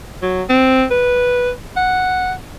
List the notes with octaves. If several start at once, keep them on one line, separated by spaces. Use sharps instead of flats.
F#3
C4
B4
F#5